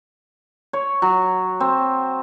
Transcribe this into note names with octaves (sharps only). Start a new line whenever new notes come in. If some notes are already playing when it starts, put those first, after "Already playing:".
C#5
F#3
C4